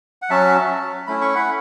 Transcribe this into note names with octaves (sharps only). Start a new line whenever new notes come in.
F#5
F#3 C#4 F#4 E5 A5
A3 C#4 E4 B5
C#6
F#5 B5